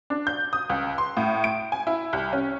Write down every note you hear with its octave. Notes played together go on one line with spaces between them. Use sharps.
D4
G6
D#6
C#2
C6
A2
D7
G#5
E4
C2
C#4